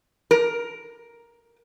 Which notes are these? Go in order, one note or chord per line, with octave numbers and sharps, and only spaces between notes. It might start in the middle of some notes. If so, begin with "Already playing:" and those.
A#4